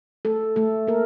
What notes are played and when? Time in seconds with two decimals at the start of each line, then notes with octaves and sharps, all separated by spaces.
0.25 A3 A4
0.56 A3 A4
0.87 A#3 A#4